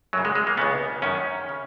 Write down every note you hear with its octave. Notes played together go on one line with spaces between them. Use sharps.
F#2 C#3 F#3
G#3
G#3
A#3
C#2 C#3 B3
F#2 D#3 C#4
C#3